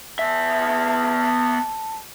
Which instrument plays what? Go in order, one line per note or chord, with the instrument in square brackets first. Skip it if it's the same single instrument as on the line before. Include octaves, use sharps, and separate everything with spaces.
[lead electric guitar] B3 E5 [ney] A5